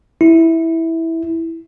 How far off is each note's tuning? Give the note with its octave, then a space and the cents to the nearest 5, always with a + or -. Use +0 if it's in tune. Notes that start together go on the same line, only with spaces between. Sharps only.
E4 -10